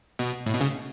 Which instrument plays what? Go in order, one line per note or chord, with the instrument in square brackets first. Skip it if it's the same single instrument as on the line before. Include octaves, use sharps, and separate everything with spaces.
[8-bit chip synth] B2
A2
B2
C#3